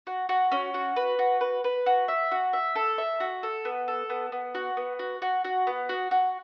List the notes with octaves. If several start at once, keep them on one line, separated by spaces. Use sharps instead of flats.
F#4
F#4
C#4
F#4
B4
F#4
B4
B4
F#4
E5
F#4
E5
A4
E5
F#4
A4
B3
A4
B3
B3
F#4
B3
F#4
F#4
F#4
B3
F#4
F#4